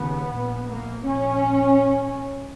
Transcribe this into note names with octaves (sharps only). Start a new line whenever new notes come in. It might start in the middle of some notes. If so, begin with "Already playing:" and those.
Already playing: D#2 C#3 B3
A#1 A#2
A#3
A#1 A#2 C#4